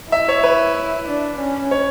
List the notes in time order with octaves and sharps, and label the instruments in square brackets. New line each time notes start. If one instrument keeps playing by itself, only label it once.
[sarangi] E4 [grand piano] E5
[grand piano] C#5
B4
[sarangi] D4
C#4
[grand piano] C#5